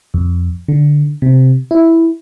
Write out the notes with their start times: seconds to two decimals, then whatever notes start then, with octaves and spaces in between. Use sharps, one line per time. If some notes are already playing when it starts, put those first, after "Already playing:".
0.14 F2
0.68 D3
1.22 C3
1.71 E4